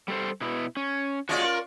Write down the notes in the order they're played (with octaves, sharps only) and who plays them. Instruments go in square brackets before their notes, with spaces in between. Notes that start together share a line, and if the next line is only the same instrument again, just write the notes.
[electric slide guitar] G3 A4 C5
B2 B3 E4
C#4
[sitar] C#4 F4 D5 [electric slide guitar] F#4 G#4 D#5
[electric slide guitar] A#4